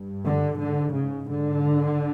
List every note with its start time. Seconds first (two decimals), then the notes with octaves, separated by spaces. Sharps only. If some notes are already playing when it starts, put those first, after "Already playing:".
Already playing: G2
0.24 D3
0.59 G#2 D3
0.94 C#3
1.30 G#2 D3